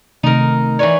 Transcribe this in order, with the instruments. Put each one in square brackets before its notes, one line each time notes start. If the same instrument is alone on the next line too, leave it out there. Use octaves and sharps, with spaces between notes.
[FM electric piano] C3 D#3 A3 [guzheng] D#4 A#4
[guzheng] E3 B4 C#5 [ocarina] D5